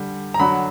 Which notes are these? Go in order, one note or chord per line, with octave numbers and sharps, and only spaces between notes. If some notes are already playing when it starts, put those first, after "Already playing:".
Already playing: D3 G3
A#5
D3 F#3 B5